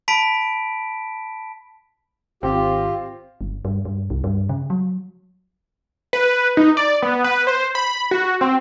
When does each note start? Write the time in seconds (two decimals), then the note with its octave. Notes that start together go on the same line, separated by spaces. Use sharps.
0.08 A5 B5 B6 D7
2.43 G#1 C4 F4 G4
3.41 G1
3.65 G2
3.85 G2
4.10 C2
4.24 G2
4.49 C#3
4.70 F#3
6.13 B4
6.57 D#4
6.77 D5
7.02 B3
7.24 B4
7.47 C5
7.75 B5
8.11 F#4
8.41 C4